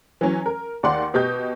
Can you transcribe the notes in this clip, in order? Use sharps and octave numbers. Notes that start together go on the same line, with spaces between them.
E3 F#3 C#4
A#4
D#2 D5 F#5 C6
B2 G4 D#5 G6